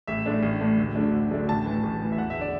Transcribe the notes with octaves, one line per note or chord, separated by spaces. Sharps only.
A1 E5
A2 A3 D4
A1
A2 A3 D4
D2
D3 F#3 A3 D4
D2
D3 F#3 A3 D4
A1 A5
A2 E3
A1
A2 E3
E5
E1 F#5
E5
D3 D5